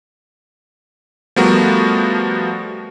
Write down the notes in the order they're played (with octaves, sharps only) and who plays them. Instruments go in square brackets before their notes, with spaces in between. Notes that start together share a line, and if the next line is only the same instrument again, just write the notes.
[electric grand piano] F3 G3 A3 B3 F#4 A#4